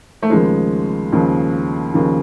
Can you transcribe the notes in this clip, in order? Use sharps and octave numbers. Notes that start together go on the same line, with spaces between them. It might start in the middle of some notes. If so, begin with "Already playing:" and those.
A3
D#2 C#3 F3 G#3
D#2 C#3 F3
D#2 C#3 F3